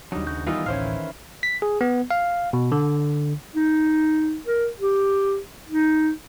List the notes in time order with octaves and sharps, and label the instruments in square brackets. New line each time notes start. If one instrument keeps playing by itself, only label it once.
[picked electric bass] D#2 D4 [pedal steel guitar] F#3 G3 [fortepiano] D#4
[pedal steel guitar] C#3 F#4 G6
[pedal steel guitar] D#3 G3 B3 [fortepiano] E3 D#4 F4
[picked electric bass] D1 A1 [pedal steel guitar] D#3 E3 E4 [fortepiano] C#4 C5 F5
[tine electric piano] B6
G#4
B3
F5
B2
D3
[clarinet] D#4
A#4
G4
D#4